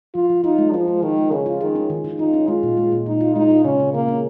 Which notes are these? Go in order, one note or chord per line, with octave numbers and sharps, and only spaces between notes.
F3 F4
F3
D#4 F4
G#3
F3 A#4
G#3
D#3 F3
G#3
C#3 C#4
F4
D#3 G#4
C#4
D#3
D#3
D#4 F4
C#4
G#3 F4
A#2
G#3
A#2
A#2 D#4
F4
G#3 D#4
F4
C#3 C#4
C#3
C#3 A#3
C#4